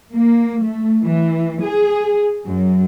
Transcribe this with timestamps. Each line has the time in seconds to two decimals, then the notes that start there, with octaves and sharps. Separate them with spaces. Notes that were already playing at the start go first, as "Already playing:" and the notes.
0.13 A#3
0.61 A3
1.03 E3
1.62 G#4
2.45 F#2